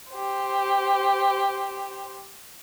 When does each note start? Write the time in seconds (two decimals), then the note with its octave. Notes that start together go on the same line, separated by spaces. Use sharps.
0.12 G4 C5